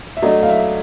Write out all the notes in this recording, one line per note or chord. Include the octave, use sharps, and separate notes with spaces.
E5
F#3 A3 D4 D#5
F5
E5